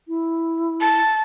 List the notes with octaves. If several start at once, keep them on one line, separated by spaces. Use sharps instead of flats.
E4
A5